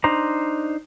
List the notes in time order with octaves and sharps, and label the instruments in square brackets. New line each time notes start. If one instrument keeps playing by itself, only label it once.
[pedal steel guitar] D4 D#4 C5 A#5